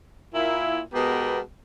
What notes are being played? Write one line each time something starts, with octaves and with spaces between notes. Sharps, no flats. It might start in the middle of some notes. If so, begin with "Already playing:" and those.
A#2 A#3 E4
B2 G#3 B3 G4 A#4